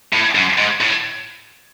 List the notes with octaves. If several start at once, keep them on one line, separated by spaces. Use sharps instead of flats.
A2
F#2
G#2
A2